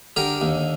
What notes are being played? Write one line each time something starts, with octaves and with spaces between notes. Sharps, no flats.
D3 G4 A#4
D#2